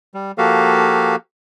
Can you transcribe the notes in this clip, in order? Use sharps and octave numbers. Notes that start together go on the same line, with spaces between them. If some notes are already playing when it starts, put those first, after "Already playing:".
G3
F3 A#3 F#4 G4 A4 F5